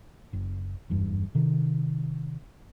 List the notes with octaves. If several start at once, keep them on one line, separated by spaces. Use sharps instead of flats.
F#1
F#1 E2 G2
C3 D#3